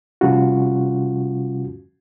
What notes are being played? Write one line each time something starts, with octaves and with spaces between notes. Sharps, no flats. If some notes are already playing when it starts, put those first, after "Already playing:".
C3 F3 G3 C#4 F4 F#4